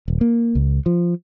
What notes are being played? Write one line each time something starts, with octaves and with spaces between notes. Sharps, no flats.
D#1
A#3
C#2
F3